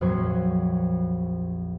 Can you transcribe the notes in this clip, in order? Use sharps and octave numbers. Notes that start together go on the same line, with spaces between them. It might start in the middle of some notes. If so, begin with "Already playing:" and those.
A#1 F2 F#3 F#4 C5 C#6